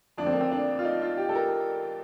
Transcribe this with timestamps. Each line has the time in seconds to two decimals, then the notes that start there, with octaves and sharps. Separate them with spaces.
0.18 F2 D3 D4
0.26 C4
0.33 A#3
0.40 C4
0.52 D4
0.79 F4
0.85 D#4
1.02 F4
1.17 G4
1.29 A4
1.35 A#4